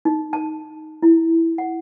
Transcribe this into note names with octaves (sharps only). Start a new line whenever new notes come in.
D#4
A5
E4
F#5